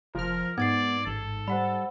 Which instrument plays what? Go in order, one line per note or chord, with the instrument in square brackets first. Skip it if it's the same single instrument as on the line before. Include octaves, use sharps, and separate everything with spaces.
[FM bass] F1 [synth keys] F3 F6 [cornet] A#4
[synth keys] G#2 [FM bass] B3 [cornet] D5 [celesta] G#6 A6 C7
[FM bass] A1 [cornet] A4
[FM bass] G3 [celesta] C5 F#5 B5